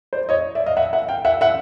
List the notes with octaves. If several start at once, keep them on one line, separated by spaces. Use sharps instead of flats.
C5 D5
C#5 D#5
D5 E5
D#5 F5
E5 F#5
E5 F#5
F5 G5
E5 F#5
E5 F#5